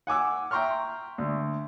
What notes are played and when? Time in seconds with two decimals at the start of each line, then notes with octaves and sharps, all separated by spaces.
0.07 F#5 G#5 D6 E6
0.51 E5 G5 A#5 C6 C#6 F6
1.18 D2